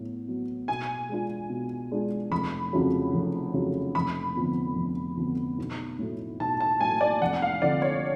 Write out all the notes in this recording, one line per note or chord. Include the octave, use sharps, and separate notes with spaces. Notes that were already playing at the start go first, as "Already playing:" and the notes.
Already playing: A2 F#3 B3
F#3 B3
B2 G#5
G#3 D4 F4
B2
G#3 D4 F4
F1 B5
F2 C#3 F#3
F1
F2 C#3 F#3
F1 B5
F2 D3 F3 B3
F1
F2 D3 F3 B3
B1
A2 F#3 A3
B1 A5
A5
A2 F#3 A3 G#5
D5
F1 F#5
F5
F2 D3 D5
C#5